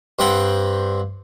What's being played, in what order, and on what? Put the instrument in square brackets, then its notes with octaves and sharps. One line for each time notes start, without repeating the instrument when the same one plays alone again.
[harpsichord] G2 C4 F#5 G5